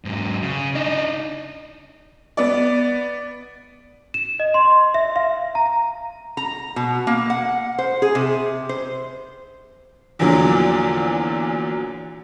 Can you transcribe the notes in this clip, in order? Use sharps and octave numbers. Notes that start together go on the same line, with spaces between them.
G#2 F#3
C#3
D4 D#4
B3 D5
E7
D#5
C6
E5
F5
A#5
A#5
B2
A#3
F#5
C5
G#4
C3
C5
E2 A#2 D3 F3 F#3